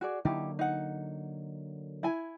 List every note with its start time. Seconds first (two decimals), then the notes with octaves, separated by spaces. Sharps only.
0.01 F#4 G#4 D5
0.25 D3 F#3 A#3 D#4 E4 G4
0.59 D#4 F#5
2.03 E4 G#5